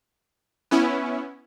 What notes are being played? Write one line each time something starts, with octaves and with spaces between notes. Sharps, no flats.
B3 C#4 E4